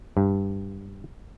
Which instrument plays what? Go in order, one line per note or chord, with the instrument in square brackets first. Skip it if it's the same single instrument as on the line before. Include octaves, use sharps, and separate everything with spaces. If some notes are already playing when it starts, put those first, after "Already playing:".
[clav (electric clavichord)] G2